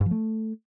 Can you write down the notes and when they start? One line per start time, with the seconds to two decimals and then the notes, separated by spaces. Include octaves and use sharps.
0.01 G2
0.06 F3
0.11 A3